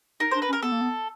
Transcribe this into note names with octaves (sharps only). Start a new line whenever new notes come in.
D#4 A#4
D4 C5
B4
C#4
A#4
B3 A4
A#3
B3